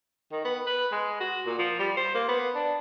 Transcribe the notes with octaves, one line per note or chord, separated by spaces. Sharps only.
D#3
B3
B4
G#3
F#4
A#2
F3
G3
C5
A#3
B3
D4